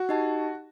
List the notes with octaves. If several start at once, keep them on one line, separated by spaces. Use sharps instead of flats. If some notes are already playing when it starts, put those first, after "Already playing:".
Already playing: F#4
D#4 G4 D#5 A5